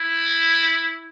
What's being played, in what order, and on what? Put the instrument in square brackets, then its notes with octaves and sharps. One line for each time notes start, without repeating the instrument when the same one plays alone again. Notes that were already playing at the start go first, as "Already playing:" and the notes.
Already playing: [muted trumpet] E4